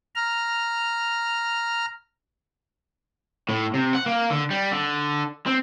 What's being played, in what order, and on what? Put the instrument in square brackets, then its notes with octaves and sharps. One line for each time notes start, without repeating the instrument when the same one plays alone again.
[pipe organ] A#5 F6
[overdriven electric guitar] A2
C3
F#5
A#3
D3
G3
D3
C4